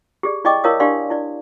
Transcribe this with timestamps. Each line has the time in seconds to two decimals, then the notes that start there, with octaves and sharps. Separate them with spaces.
0.23 G4 G#4 D5
0.45 E4 D5 D#5 G5 C#6 D6
0.64 E4 A#4 C#5 F5 D#6
0.80 D4 G4 D5 F5 C6
1.10 E4 D5